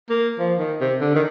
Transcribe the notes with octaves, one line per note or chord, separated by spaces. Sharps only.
A#3
F3
D#3
C3
D3
D#3